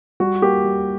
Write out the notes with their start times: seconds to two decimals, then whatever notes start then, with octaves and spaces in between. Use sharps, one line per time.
0.20 G3 F#4
0.42 A#3 G4
0.64 G3